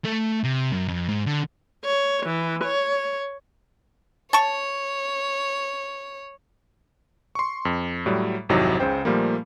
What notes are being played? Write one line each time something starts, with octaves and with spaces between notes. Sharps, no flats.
A3
C3
F#2
F2
G#2
D3
C#5
E3
C#5
C#5 A5 C#6
C6 C#6
F2
A2 F#3 G3
G#1 F2 C3 F#3 D#4 E4
C#2 C#3 C5 G5
A#2 F3 G3 A3 A#3